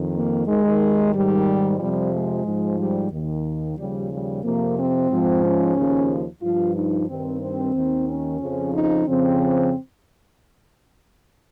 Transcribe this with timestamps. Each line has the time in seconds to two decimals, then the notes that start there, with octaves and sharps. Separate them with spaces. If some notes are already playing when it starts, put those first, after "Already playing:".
Already playing: F2 D#3
0.14 A#3
0.46 D#2 D#3 G#3
1.13 G#2 D#3 G3
1.79 F2 C3 F3 G3
2.12 G#3
2.46 G#2 F3
2.79 G3
3.11 D#2 D#3
3.77 D#2 C#3 F3 G3
4.11 G3
4.43 F2 C3 F3 A#3
4.77 C4
5.10 G#2 F3
5.43 C#4
5.76 D#2 C#3 F3
6.42 G2 F3 F4
6.75 D#4
7.09 G2 D#3 C4
7.41 C4
7.74 D#2 D#3
8.07 C#4
8.41 F2 C#3 F3
8.74 D#4
9.07 F2 C#3 F3 C4